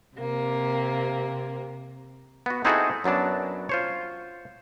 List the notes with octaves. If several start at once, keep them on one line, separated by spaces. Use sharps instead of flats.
C3 A#3
B3 F#4
C4 D#4 E4 F#4 G#4 A4
F#2 F#3 B3 D4 A5
F4 C5 C#5